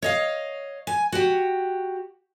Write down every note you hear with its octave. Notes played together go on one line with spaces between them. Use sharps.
C#5 D#5 F5
G#5
F#4 G4